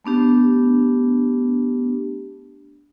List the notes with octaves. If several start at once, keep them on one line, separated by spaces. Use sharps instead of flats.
A3 B3 D4 G4